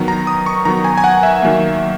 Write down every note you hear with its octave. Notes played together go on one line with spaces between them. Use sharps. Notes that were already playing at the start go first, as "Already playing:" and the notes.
Already playing: D#3 F#3 B3
A#5
D#6
C#6
D#3 F#3 B3 A#5
G#5
G#5
F#5
E5
D#3 F#3 A#3